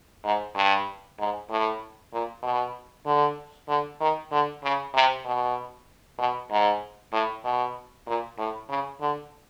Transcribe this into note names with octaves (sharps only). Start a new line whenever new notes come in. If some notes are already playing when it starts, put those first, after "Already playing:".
G#2
G2
G#2
A2
A#2
B2
D3
D3
D#3
D3
C#3
C3
B2
B2
G#2
A2
B2
A#2
A2
C#3
D3